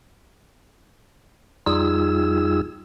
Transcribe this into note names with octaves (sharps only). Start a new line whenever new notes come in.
F2 G3 D#4 F4 G#4 E6